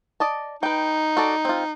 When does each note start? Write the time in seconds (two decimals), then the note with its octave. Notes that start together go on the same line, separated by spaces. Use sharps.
0.20 D5 D#5 A5
0.63 D#4 B4 G5
1.17 F#4 A4 D5
1.45 C4 F4